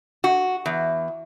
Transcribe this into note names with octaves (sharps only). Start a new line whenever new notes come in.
F#4
E2